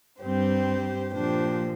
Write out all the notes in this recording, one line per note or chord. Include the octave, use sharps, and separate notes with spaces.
G2 G3 C4 G4 C5
A#2 F3 D4 G4 C5